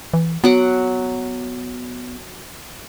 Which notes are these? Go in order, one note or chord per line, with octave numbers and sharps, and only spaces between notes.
E3
F#3 B3 F#5 D6